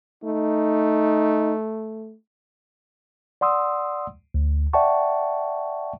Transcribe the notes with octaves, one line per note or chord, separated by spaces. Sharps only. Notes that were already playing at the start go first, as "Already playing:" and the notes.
A3 D#4
D5 F#5 C6 D#6 E6
D2
D5 E5 F#5 G5 A5 C#6